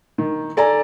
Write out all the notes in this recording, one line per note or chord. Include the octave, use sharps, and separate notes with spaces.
D#3
A4 D5 G#5 A#5